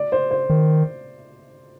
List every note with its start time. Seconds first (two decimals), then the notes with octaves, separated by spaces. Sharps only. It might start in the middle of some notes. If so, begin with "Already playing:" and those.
Already playing: D5
0.12 C5
0.31 C5
0.50 D#3